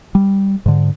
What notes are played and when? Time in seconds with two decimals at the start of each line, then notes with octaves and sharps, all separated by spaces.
0.15 G3
0.66 G#2 D3